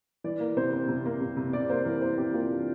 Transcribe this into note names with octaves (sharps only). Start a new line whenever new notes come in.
E3 D5
A#3
C3 C5
C3
C3
A#3
C3
C3
C3 D5
A#3 C5
E3 A#4
A#3 C5
C3 G4
A#3 F4
E3 D4